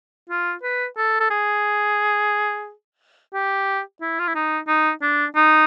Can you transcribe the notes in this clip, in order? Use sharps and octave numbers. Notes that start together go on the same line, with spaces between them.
F4
B4
A4
A4
G#4
G4
E4
F4
E4
D#4
D#4
D4
D#4